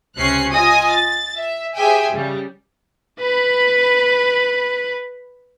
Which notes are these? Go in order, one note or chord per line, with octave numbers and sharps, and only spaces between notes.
C#2 C3 C#4 F#6 C7
F4 D#5 G#5 D#6
A6
E5
G4 G#4 C5 E5 G5 G#5
C#3 G3
B4 B5